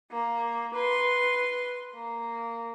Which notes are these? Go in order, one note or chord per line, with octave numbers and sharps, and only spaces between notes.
A#3
B4 C6
A#3